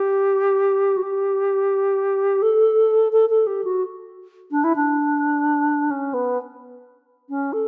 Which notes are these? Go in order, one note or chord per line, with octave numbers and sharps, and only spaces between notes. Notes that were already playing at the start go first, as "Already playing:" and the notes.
Already playing: G4
F#4
G4
A4
A4
A4
G4
F#4
D4
E4
D4
C#4
B3
C#4
A4